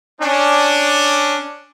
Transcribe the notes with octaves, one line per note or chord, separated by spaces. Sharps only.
C#4 D4